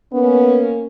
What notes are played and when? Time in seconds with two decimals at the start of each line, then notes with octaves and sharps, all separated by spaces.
0.13 A#3 B3 C#4